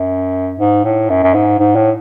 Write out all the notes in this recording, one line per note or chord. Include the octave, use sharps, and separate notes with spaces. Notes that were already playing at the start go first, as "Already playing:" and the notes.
Already playing: F#2
G#2
A2
F#2
F#2
G#2
G#2
A2